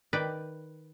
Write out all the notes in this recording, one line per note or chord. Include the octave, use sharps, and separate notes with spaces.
D#3 B4 D5 G5